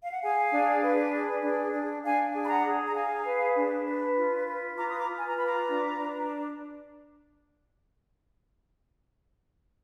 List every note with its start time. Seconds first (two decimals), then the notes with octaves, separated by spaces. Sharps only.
0.03 F5
0.12 F#5
0.21 G#4 F5 G#5
0.52 D4
0.83 B4
1.13 G#4
1.43 D4
1.73 D4
2.04 D4 F5 G#5
2.34 G#4
2.44 B5
2.49 F#5 A#5
2.64 G#4
2.86 A#5
2.95 G#4 F5 G#5
3.25 B4
3.56 D4
3.85 B4
4.16 F4
4.46 B4
4.77 F4 A#5 D6
4.89 D#6
4.99 A#5 D6
5.07 F4
5.17 G#5
5.27 A#5
5.36 B4 B5
5.45 A#5 D6
5.68 D4
5.99 D4